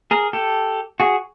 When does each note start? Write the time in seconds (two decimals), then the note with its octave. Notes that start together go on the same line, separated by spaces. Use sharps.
0.11 G#4 A#4
0.33 G4 A4
1.00 F#4 G#4